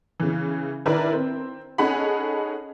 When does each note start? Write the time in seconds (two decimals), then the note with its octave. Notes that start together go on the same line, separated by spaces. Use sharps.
0.20 C#3 E3
0.85 D#3 D4 E4 A#4 B4 D5
1.13 C4
1.78 C#4 D#4 G#4 A4 F#5 B5